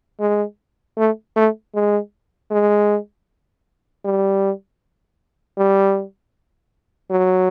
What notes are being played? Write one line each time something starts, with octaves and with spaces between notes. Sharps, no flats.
G#3
A3
A3
G#3
G#3
G3
G3
F#3